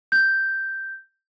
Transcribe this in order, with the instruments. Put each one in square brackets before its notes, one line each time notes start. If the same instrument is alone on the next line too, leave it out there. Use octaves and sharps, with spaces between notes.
[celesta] G6